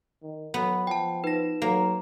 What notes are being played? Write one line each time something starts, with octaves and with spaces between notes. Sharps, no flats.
D#3
F#3 B3
F3 G5 A5
D#4 B4 A#6 E7
F#3 A#3